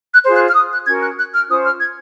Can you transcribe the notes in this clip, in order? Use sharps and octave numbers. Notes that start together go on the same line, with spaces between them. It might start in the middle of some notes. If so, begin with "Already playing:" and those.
F#6
F4 G#4 C5
F#6
F6
D#6
F#6
C#4 F#4 A#4 G#6
F#6
F#6
F6
C#4 F4 C5 D#6
F6
G#6